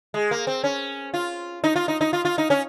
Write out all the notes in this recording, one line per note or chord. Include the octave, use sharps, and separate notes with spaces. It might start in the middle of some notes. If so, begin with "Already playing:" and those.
G#3
A#3
C4
C#4
F4
D#4
F4
D#4
D#4
F4
F4
D#4
C#4